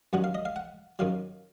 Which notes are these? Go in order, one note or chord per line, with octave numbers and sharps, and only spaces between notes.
F#2 D#3 F#3 F#5
F5
D#5
F5
F#5
F#2 D#3 F#3 F5